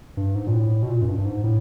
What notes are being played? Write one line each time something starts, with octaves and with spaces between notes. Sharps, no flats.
G2
G#2
A#2
A2
B2
A#2
F#2
G2
G2
G#2
A2